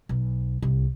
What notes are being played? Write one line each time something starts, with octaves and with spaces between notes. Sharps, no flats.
B1
C2